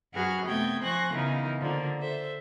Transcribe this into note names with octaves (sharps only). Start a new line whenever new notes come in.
F#2 F#4 G#4 B4 F6
C3 A3 B3 D#5 G5 G#6
F3 C5 G#5 C#6 F#6 A#6
C#3 E3 B3 D#4 F4 A#4
D3 F3 A#3
A4 C5 E5